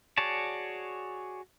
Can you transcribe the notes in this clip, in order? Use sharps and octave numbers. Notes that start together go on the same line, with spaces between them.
F#4 G#4 C#5 D5 A5